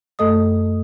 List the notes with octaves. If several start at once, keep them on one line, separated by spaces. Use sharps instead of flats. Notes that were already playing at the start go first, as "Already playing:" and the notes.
F#2 A3 A4 D#5 D#6